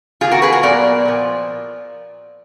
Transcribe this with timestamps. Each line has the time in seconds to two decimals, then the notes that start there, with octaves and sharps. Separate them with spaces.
0.21 D#3 A#3 F4 G#4
0.32 F#4 A#4
0.42 G#4 B4
0.52 F#4 A#4
0.63 A#2 F#3 B3 A#4 D5
1.05 A#2 F3